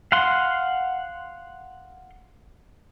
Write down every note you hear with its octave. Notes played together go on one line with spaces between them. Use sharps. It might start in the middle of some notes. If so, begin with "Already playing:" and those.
F5 F#5 C6